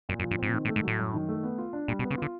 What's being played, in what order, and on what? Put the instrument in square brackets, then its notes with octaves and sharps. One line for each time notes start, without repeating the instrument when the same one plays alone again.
[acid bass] F#2 [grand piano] A#2
[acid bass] F#2
[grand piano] F3
[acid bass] G2
[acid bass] G#2 [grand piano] C4
[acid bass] A#2
[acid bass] A2 [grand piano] D#3
[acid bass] A2
[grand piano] A3
[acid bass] G#2
[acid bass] A2 [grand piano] F#3
[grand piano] F#2
D#3
A3
B3
F4
D4
[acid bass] A#2 [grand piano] G3
[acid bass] B2
[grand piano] B3
[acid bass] C#3
[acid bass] D3 [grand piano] F4